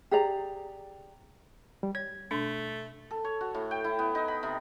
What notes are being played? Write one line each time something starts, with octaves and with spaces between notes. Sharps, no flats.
G4 G#4 D5 A#5
G3
C#5 G#6
B2 A3 D4
A4
C#5
F#4
A2
G5
E4
B3
D#4
B5
C3